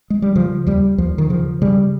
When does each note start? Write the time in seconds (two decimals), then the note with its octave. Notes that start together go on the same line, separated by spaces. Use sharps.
0.10 G#3
0.22 G3
0.36 C#3 F3
0.67 D#2 G3
0.98 D#2 F3
1.18 D#3
1.30 C#3 F3
1.62 C#3 G3